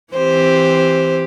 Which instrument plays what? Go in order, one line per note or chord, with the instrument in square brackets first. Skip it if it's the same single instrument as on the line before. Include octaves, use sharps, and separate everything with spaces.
[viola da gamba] E3 C4 G4 [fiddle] C5